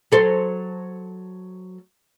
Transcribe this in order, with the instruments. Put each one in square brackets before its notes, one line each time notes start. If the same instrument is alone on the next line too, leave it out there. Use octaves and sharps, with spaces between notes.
[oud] F#3 A4 C5